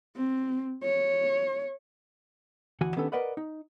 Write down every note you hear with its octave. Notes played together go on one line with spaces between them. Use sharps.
C4
C#5
D2 E3 F#4 F#5 G#5
D#3 B3 C#4 D4 G4 A4
A#4 B4 D5 D#5 F#5 B5
D#4